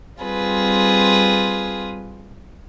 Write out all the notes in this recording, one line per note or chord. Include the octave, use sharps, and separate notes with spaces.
G3 C4 F4 G#4 B4